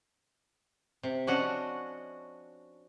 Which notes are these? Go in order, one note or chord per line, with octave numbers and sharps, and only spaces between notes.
C3
F3 C#4 D4 F#4 D#5 F#5